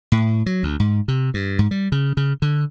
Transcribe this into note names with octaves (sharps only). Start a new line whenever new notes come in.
A2
F#3
D2
G#2
C3
G2
G#2
G3
C#3
C#3
D3